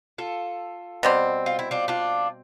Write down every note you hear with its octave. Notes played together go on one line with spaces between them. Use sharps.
F4 A4
B2 G3 C4
F4
E4
D4 F4
D4 F4